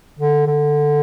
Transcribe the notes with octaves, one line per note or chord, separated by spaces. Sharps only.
D3
D3